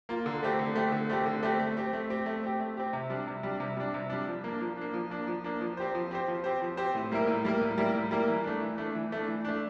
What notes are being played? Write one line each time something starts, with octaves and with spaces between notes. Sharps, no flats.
A#3 F4
D3
A3 C4 G4
D3
A3 C4 G4
D3
A3 C4 G4
D3
A3 C4 G4
A3
C4 G4
A3
C4 G4
A3
C4 G4
A3
C4 G4
C3
G3 D4
C3
G3 D4
C3
G3 D4
C3
G3 D4
F3
A#3 D4
F3
A#3 D4
F3
A#3 D4
F3
A#3 D4
F3
C4 G4 C5
F3
C4 G4 C5
F3
C4 G4 C5
F3
C4 G4 C5
A2
G3 A#3 E4 A#4
A2
G3 A#3 E4 A#4
A2
G3 A#3 E4 A#4
A2
G3 A#3 E4 A#4
E3
A3 D4
E3
A3 D4
E3
A3 D4
E3
A3 D4